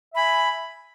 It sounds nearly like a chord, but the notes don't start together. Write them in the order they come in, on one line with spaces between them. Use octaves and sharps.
E5 B5 G#5